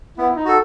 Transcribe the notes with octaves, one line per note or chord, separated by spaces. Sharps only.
B3 E4
D#4
F#4 A4